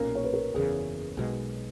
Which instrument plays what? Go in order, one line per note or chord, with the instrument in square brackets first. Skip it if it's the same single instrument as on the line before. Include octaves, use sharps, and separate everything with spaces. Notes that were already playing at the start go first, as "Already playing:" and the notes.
Already playing: [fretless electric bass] B1 A#2 A#3 C#4 [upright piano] A#4
[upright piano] C#5
B4
A#4
[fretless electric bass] F#1 E2 C#3 [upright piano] G#4
[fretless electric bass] B1 B2 G#3